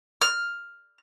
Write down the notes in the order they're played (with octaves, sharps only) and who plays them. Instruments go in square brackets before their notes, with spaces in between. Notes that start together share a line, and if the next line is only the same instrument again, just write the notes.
[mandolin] F6